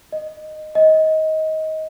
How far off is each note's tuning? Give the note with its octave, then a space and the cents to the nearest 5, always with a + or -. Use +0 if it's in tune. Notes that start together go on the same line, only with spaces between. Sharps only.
D#5 -10
D#5 +20